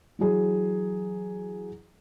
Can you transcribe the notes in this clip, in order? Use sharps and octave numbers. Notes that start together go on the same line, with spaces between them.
E3 F#3 G#4